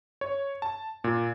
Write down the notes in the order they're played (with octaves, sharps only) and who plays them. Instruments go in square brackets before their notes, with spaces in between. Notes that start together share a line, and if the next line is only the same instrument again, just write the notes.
[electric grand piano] C#5
A5
A#2